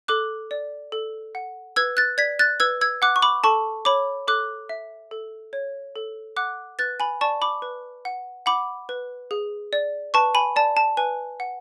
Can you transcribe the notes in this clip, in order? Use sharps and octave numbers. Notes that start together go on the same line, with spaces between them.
A4 D6 F#6
D5
A4
F#5
B4 E6 G#6
F#6 A6
D5 G#6 B6
F#6 A6
B4 E6 G#6
E6 G#6
F#5 D6 F#6
C#6
B5 D6
A4 A5 C#6
C#5 B5 D6
A4 D6 F#6
E5
A4
C#5
A4
F#5 D6 F#6
B4 F#6 A6
G#5 B5
D5 A5 C#6
B5 D6
B4
F#5
F#5 B5 D6
B4
G#4
D5
B4 A5 C#6
G#5 B5
D5 A5
A5
B4 G#5
F#5